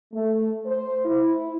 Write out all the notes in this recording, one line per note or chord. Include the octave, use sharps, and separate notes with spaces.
A3
C5
E4